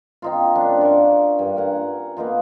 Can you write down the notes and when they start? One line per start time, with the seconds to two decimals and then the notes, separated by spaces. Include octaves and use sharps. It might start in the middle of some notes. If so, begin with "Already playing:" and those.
0.22 C4 D#4 F4
0.55 F#2 D4 F#4
0.81 F4 A#4 C#6
1.39 G2
1.57 A#4 F#5 G#5
2.17 A#3 B3 D#4 F4